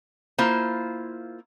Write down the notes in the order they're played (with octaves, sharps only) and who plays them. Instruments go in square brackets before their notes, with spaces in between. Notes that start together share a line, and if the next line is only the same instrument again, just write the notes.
[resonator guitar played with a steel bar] A#3 E4 F4 C5